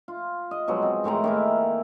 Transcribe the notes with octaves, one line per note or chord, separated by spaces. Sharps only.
F4
D#5
B2 F3 F#3 G#3
C4
A2 D#3 G#3 A#5
D#3 A#3 E4